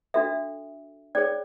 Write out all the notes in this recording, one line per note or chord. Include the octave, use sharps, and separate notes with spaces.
D4 F#4 A4 E5
C#4 G#4 C#5 D5